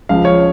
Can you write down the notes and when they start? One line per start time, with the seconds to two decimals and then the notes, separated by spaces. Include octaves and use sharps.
0.09 C#2 C#3 F3 F5
0.25 C#5